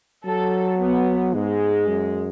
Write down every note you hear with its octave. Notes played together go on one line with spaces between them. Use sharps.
F#3 A4
B3
G#2 G#3
F#2